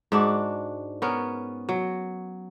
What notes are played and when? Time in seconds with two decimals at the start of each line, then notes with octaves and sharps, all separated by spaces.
0.12 G#2 D4 F#4
1.02 B3 C#4 A#4
1.69 F#3